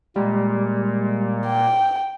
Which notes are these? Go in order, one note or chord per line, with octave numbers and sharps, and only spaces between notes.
A#2 G3 G#3 A#3
G5